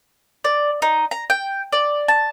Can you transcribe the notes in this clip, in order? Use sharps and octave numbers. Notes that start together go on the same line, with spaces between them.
D5
D#4
A#5
G5
D5
A5